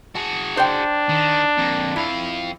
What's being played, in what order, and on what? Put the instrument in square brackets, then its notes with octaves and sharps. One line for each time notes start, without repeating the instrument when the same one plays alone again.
[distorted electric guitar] F#4 G#4 [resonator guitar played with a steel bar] A5
[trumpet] D4 [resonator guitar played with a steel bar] C5 G5
[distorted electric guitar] D#3
F2 A#3
[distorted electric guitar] F2 F5 [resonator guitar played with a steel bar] E4